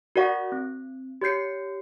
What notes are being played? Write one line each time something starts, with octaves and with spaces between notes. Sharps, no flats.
F#4 A#4 D5 F#5 C#6 A#6
C4
G4 C#5 G6 C7 C#7